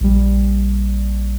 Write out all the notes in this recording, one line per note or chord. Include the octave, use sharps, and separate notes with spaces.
A#1 G3